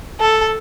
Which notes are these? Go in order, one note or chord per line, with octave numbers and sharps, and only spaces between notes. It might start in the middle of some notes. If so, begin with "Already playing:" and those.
A4